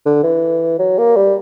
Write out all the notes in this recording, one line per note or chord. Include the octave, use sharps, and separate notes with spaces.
D3
E3
F#3
A#3
G3